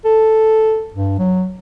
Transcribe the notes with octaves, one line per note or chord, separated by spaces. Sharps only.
A4
G2
F#3